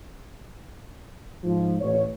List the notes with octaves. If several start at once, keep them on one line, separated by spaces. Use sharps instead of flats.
G#2 F3
A1 C#5